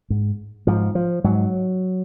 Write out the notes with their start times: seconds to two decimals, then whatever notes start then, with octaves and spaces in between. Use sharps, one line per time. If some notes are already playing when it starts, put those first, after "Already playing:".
0.10 G#2
0.67 G#2 F3
0.95 F3
1.24 G#2 F#3